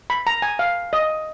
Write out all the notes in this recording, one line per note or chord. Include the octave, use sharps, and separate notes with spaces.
B5
A#5
G#5
F5
D#5